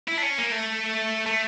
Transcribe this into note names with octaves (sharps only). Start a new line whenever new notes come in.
E4
D4
C#4
A#3
A3
A3